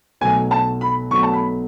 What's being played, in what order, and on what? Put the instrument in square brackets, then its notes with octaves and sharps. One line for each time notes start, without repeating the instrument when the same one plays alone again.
[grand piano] B1 B2 F#3 A3 [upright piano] G#5
[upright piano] A5
B5
[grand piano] B1 B2 F#3 A3 [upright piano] C#6
[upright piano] A5
B5